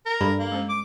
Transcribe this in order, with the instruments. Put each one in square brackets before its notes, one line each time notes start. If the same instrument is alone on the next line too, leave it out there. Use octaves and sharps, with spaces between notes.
[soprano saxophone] A#4
[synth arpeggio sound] G2 [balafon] A4 B5
[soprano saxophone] A#3
[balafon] G#3 C#4 C5
[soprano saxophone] D6